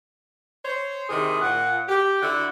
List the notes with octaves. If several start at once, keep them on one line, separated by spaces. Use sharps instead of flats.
C5 C#5
C3 D#3 E4 G#4
A#2 F#5
G4
D3 E4 F#4 F#5